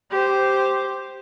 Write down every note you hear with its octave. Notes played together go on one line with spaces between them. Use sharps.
G4 C5